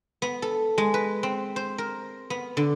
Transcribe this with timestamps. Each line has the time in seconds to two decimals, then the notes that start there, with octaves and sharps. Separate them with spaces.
0.22 B3
0.42 A4
0.78 G#3
0.94 B4
1.23 C4
1.56 C5
1.78 A#4
2.30 B3
2.57 D3